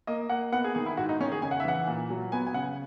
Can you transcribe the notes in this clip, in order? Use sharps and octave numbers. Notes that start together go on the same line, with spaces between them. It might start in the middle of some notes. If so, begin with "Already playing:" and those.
A#3 D#5
A#3 F#5
B3 F#5
G#4
D#3 G#4
E4
G#2 F#4
D#4
D#3 C#4
G#4
C#3 G#5
F#5
E5
E3 F#5
A#2
F#3
B3 G#5
G#5
C#3 F#5